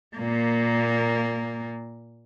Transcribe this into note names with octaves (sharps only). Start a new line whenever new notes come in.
A#2 A#3